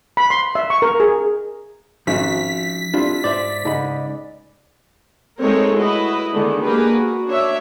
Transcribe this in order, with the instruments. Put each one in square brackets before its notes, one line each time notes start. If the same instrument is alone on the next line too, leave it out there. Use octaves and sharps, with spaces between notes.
[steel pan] B5
C6
E5
C#6
A#4
G#4
[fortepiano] G#1 [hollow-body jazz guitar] F3 C#4 F#4 [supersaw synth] B6
[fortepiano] G3 E4 F4 [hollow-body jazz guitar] C4 D4
[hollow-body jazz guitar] G#2 C5 E5 [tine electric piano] D5
[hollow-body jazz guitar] C#2 B5 [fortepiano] G#2 D#4
[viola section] G#3 A3 C4 D#4 A#4 C#5
E4 F#4 B4 D#5
D3 D#3 G#3 A3 B3 D4
A#3 D4 G4 G#4 A#4 B4
F#4
D4 C#5 E5